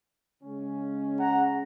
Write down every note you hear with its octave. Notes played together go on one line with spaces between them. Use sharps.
C#3 G#3 C#4
F#5 A#5